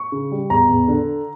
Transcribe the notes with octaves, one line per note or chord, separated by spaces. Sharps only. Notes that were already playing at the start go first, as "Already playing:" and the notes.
Already playing: C#6
C#3
G3
E2 A#5
E2
D3